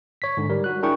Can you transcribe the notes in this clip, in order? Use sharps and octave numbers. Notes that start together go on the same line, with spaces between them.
C#5 B6
G#2 D3
G3 A#4
F#4 F#6
D4 E4 G#4 A#4 G5 C#6